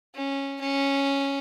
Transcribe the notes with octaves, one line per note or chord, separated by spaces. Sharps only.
C#4
C#4